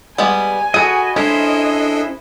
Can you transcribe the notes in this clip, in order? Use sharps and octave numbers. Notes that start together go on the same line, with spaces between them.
G3 G#3 B3 G#5
F#4 G#4 A4 B4 D#5
G#3 C#4 D4 E4 A4 C5 D#5